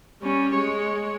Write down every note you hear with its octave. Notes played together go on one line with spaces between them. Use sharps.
G3 C#4
G#3 C#5